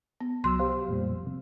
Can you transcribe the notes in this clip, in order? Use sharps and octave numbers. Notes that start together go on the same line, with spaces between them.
B3
C2 F#3 C6 E6
G4 C5 F5
F2 A#2 G3
C3